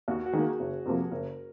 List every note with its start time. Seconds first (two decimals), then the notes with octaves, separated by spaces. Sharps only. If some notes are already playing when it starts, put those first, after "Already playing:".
0.08 D#2 F#4
0.26 F#4
0.33 D#3 A#3 G#4
0.59 F#1
0.85 F2 C3 F3 A#3
1.11 F#1 A#4